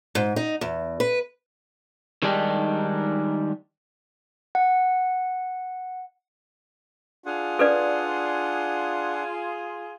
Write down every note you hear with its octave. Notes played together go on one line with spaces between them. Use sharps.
G#2
D#4
E2
B4
D#3 G3 G#3 D4 D#4 G4
F#5
D4 F4 G#4 F#5
A4 B4 D5